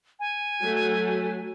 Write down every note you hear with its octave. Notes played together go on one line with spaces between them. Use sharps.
G#5
F#3 A3